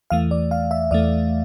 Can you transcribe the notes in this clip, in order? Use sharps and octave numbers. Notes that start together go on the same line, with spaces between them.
E2 E3 A3 F5
D5
F5
E5
E2 E3 A3 D5